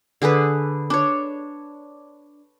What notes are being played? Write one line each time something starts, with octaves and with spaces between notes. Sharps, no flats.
D3 G#4 A4 B4
D4 C#5